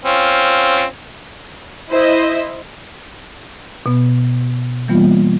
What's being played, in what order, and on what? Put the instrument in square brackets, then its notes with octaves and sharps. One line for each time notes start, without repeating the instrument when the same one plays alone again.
[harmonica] C4 C#4 F4
[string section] E4 C5 D#5 E5
[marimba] B2 B3
E3 G3 A#3 B3 F4